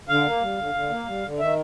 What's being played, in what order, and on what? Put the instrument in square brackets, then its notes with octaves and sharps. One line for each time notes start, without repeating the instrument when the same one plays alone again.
[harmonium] D3 F5
A#3
G3
D3
D3
A#3
G3
D3
D#3 E5